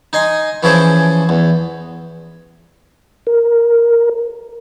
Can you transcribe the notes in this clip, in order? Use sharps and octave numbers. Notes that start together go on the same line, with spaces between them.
D#4 D#5 G#5 C6
E3 F3 C#4 G#4 A4 C5
E2
A#4